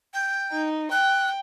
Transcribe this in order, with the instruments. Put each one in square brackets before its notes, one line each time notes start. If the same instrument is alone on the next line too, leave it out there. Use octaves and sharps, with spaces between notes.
[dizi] G5
[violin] D#4
[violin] G5 [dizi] F#6